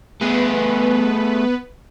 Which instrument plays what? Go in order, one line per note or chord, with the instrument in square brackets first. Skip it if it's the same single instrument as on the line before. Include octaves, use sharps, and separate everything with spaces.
[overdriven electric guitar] A3 G#4 [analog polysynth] B3 B4